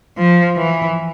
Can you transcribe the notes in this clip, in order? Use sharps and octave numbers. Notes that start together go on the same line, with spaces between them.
F3
E3